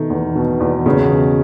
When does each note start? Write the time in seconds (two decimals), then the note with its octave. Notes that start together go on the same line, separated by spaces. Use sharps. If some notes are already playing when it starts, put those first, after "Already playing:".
Already playing: B2 D#3 A3
0.10 E2
0.36 B2
0.60 E2
0.86 E2 C#3
1.11 B2